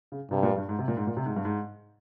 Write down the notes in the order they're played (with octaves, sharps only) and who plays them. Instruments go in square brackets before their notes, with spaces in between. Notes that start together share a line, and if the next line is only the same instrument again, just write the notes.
[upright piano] C#3
[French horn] G2 [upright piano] C3
[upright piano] A#2
G2
G#2
C3
A#2
G#2
A#2
C3
G#2
G2
G#2